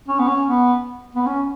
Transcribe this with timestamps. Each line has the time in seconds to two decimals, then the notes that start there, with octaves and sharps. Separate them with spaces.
0.08 C#4
0.19 B3
0.28 C#4
0.47 B3
1.15 B3
1.26 C#4